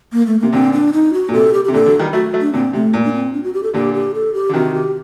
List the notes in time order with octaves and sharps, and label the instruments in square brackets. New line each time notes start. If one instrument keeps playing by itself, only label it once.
[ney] A#3
A3
[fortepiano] C3 [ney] A#3
[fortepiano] A#2 D3 [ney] C4
[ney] D4
D#4
F#4
[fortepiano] A#2
[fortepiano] C3 [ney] A4
[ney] G4
G4
[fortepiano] C3
[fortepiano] A#2 D3 [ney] A4
[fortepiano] D3 F#3
D#3 G3
[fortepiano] F#3 A3 [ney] F#4
[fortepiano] F#3 A3
[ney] D4
[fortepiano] A#2 D3 [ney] C4
[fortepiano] C3 [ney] A3
[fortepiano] A#2
[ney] D4
C4
D4
F#4
G4
A4
[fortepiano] A#2 D3 [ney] G4
[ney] G4
A4
G4
[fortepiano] D3
[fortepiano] C3 D#3 [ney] F#4
[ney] G4